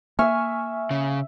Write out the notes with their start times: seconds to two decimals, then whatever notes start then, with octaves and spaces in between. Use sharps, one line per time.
0.19 A#3 E5 G#5 C#6 F6
0.91 C#3